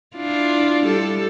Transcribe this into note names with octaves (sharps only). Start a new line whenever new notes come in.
D4 E4 F4
G3 A4